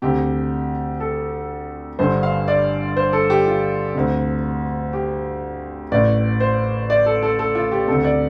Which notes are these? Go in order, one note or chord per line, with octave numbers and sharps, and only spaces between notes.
D2 C3 G4
A4
G1 G2 D3 C5
F5
D5
C5
A4
G4
F4
D2 C3
G4
A1 A2 D5
C5
D5
A4
A4
A4
F4
G4
D2 C3 A4
D5